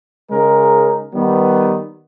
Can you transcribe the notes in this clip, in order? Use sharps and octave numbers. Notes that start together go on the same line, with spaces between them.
C#3 G#3 D#4 A#4
D#3 G3 B3